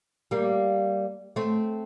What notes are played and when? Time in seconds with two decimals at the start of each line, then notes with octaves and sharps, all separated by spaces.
0.31 G3 A#3
1.36 A3 C4